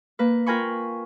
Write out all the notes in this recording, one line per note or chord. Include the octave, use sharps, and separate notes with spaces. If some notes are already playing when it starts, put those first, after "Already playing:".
A#3 B4
F4 A#4 G5 G#5 B5 C#6